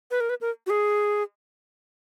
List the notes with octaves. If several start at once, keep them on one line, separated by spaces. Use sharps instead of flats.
B4
A#4
B4
A#4
F#4
G#4